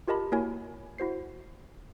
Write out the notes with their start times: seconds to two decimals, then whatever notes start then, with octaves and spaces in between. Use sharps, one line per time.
0.08 F4 G4 A#4 D#5 A5 B5
0.32 A#3 E4 F#4 A#4 C#5 G#5
0.98 E4 F#4 C5 C7